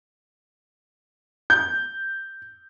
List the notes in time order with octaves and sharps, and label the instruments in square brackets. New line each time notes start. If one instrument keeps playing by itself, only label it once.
[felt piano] G6